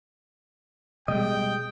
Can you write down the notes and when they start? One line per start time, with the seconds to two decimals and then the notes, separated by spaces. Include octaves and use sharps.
1.08 B2 G3 G#3 D#5 G5